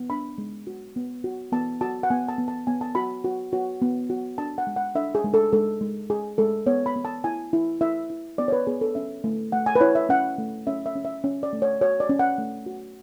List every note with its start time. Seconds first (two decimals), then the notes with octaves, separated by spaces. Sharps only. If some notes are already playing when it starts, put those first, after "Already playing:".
Already playing: B3
0.10 D4 B5
0.38 G#3
0.67 F#4
0.96 B3
1.24 F#4
1.52 B3 A5
1.81 F#4 A5
2.03 F#5
2.10 B3 G#5
2.29 A5
2.38 B3
2.48 A5
2.67 B3 G#5
2.81 A5
2.95 F#4 B5
3.24 F#4
3.53 F#4
3.82 B3
4.10 F#4
4.38 D4 A5
4.58 F#5
4.67 G#3
4.76 F#5
4.95 D4 E5
5.15 G#4
5.24 G#3
5.34 A4
5.53 G#3 A4
5.81 G#3
6.10 G#3 G#4
6.38 G#3 A4
6.66 B3 C#5
6.86 B5
6.96 B3
7.05 A5
7.24 E4 G#5
7.53 E4
7.81 E4 E5
8.10 E4
8.38 B3 D5
8.48 C#5
8.52 B4
8.67 B3 G#4
8.81 A4
8.95 C#4 E5
9.24 A3
9.52 A3 F#5
9.66 G#5
9.75 B4
9.81 E4 C#5
9.95 E5
10.09 C#4 F#5
10.38 A3
10.67 C#4 E5
10.86 E5
10.95 C#4
11.05 E5
11.24 C#4
11.43 D5
11.53 A3
11.62 C#5
11.81 F#4 C#5
12.00 D5
12.09 C#4
12.19 F#5
12.38 A3
12.66 F#4